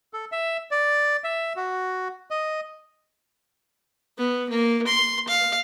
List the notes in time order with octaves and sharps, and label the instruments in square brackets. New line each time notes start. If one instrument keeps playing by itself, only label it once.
[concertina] A4
E5
D5
E5
F#4
D#5
[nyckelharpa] B3
A#3
C6
F5